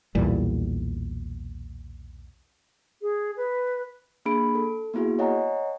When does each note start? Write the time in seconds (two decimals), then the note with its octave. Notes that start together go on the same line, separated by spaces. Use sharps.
0.15 B1 E2 A#2 G3
3.02 G#4
3.37 B4
4.25 A#3 D4 G#4 B5 D7
4.55 A4
4.94 A#3 B3 E4 F#4 G#4
5.19 C#5 D#5 F#5 G#5 A#5